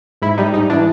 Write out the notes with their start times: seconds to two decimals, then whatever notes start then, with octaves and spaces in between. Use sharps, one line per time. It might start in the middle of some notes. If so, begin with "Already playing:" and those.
0.22 G#2 E4
0.38 G3 D#4
0.54 G#2 D#4
0.70 E3 D4